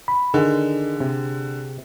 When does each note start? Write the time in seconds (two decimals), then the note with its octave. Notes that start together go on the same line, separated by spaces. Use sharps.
0.08 B5
0.34 D3 D#3 G#4
1.00 C3